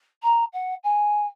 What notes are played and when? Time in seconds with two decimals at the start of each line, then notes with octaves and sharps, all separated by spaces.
0.23 A#5
0.53 F#5
0.84 G#5